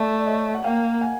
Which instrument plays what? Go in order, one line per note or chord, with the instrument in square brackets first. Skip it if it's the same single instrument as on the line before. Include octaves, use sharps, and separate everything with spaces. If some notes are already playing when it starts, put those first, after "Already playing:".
Already playing: [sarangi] A3 [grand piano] D5 E5
[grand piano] D5
C#5 D#5
F#5
[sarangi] A#3 [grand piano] F5 G5
[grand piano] F#5 G#5